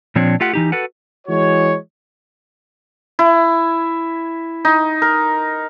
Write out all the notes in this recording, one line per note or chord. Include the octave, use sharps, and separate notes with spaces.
A#2 F3 C4 D4 C#5
A3 F4 G4 F#5
E3 D#4 G4
F#4 A4 B4 F#5
E3 G#3 F#4 C#5
E4
D#4
A#4